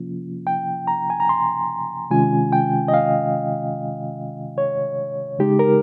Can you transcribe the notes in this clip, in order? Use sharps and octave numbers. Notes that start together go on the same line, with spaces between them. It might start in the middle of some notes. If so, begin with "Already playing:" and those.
Already playing: C3 F3 A#3 C#4 F4
G5
A#5
G#5
A#5
C6
C3 D#3 G#3 C#4 F4 G#5
G5
D#5
F5
C#5
C#3 G#3 D#4 G4
A#4